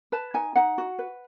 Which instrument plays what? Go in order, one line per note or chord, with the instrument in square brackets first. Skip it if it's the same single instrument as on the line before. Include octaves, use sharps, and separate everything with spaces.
[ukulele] B4 A5
D#4 G#5
D#4 F#5
F#4
B4